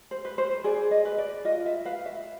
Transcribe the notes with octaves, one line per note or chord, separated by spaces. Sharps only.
C5
B4
C5
G#4 D5
D#5
B4
D5
F4 D#5
E5
B4 F5
E5